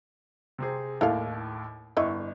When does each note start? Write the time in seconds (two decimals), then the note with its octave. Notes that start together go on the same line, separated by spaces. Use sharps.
0.58 C3 C4 G#4
1.01 D#2 A2 E4 A4 F5
1.97 G1 E4 D#5 C#6